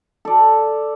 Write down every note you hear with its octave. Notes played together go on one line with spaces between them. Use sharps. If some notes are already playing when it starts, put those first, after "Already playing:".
A4 D5